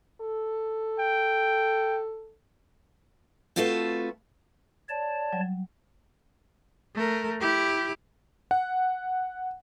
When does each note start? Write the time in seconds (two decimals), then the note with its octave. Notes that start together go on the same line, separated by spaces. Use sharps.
0.21 A4
1.00 G5
3.56 A3 C4 F4 F#4 A4 B4
4.89 C#5 D5 A5
5.33 F#3 G3
6.95 A3 A#4
7.40 E4 G4
8.51 F#5